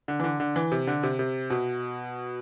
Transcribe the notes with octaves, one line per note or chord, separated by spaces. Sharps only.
D3
E3
D3
D3
E3
C3
D3
C3
C3
B2